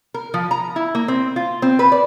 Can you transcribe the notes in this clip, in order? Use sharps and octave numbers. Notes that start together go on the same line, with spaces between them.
A#4
F3
A#5
E4
A#3
C4
F4
C4
B4
D5